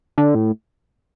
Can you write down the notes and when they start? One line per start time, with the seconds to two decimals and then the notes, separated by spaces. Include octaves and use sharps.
0.18 D3
0.35 A2